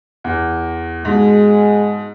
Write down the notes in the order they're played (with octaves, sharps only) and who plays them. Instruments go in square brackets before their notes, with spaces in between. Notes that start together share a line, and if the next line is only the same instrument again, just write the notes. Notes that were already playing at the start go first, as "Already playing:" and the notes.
[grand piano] E2
[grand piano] G#2 B2 [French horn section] G#3